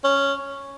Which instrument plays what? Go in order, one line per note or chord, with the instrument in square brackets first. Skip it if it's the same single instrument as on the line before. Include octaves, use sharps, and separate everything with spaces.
[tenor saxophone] C#4